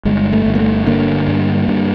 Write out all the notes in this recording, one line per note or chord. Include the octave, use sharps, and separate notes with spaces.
G1 G#3
A3
G1
A#3
A3
D3 A#3
G2
G2